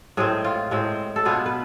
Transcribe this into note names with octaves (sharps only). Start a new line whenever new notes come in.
A2 G#3 C4 G#4
F4
A2 G#3 C4
A4
B2 B3 D4 F4 G#4
B4